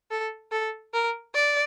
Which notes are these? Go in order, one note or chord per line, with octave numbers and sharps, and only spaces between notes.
A4
A4
A#4
D5